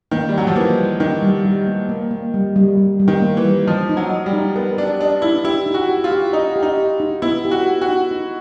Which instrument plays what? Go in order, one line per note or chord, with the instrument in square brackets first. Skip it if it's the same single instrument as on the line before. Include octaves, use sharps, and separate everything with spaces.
[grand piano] D#3 [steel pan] A#3
[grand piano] G3
[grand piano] F#3 [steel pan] A#3
[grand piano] F3
[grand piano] E3 [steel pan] A#3
[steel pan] G3
[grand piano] D#3 [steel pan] D#4
[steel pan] G3
G3
A#3
A#3
A#3
G3
G3
G3
G3
[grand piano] D#3
[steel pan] A#3
[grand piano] E3
[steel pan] G3
[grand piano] F3 [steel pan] D#5
[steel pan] D#4
[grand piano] F#3
[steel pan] D#5
[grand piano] G3
[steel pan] D#4
[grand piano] B3 [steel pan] A#4
[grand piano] D4 [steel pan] G4
[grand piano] D4 [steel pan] D#5
[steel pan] D#4 [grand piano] E4
[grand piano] E4 [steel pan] G4
[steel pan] D#4
[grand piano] F#4
[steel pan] G4
[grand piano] F4
[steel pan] G4
[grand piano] D#4 [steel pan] D#5
[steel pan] G4
[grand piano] D#4
[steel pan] G4
D#4
[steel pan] B3 [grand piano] E4
[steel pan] G4
[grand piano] F#4
[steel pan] B3
[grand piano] F#4
[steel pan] D#4
D#4